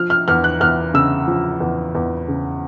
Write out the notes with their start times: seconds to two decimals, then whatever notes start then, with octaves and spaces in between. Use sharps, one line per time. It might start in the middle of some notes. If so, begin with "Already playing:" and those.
Already playing: F3 F6
0.10 F6
0.28 E2 F6
0.44 F#6
0.60 E2 F6
0.94 C#3 E6
1.28 F3
1.60 E2
1.95 E2
2.28 C#3